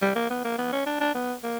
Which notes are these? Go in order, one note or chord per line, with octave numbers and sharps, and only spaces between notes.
G3
A#3
B3
A#3
B3
C#4
D4
D4
B3
A#3